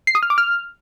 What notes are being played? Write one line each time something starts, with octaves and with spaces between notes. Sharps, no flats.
C7
D#6
F6
D6
F6